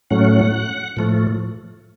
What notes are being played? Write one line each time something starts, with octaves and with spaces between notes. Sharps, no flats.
A2 F#3 A3 C#4 F#5
A2 F3 A3